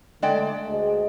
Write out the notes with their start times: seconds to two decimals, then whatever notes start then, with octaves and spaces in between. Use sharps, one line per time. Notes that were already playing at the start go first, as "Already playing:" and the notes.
0.22 D3 G#3 A3 D5 G5
0.69 D2 G#4 D#5